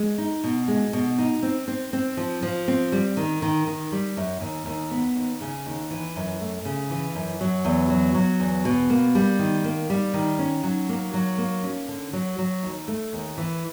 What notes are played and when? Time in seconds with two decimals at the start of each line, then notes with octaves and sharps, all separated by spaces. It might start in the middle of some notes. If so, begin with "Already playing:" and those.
Already playing: G#3
0.18 D#4
0.44 B2
0.68 G#3
0.93 B2
1.18 D#4
1.43 C4
1.68 C4
1.93 C4
2.17 F3
2.43 F3
2.68 C4
2.92 G3
3.17 D#3
3.42 D#3
3.67 D#3
3.92 G3
4.17 F#2
4.41 D#2
4.66 D#2
4.91 B3
5.16 D#2
5.41 C#3
5.66 D#2
5.91 E3
6.16 F#2
6.41 A3
6.65 C#3
6.90 E3
7.15 F#2
7.41 F#3
7.65 E2
7.90 F#3
8.15 F#3
8.40 E2
8.65 B2
8.90 A#3
9.15 G3
9.39 D#3
9.64 A#3
9.90 G3
10.14 D#3
10.39 C#4
10.63 F#3
10.89 A#3
11.14 F#3
11.38 A#3
11.63 C#4
11.88 D3
12.13 F#3
12.38 F#3
12.63 D#2
12.88 A3
13.13 D#2
13.38 E3